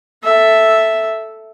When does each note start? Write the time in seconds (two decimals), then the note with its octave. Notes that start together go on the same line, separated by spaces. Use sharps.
0.24 A4 E5